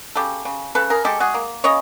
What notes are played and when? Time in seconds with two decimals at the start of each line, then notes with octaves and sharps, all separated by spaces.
0.16 C#3 G4 A4
0.45 C#3
0.75 C#3 A4 B4
0.90 G#4 A#4
1.05 G#3 G4 A4
1.20 F#4 G#4
1.34 A#3
1.64 C#3 C#5 D#5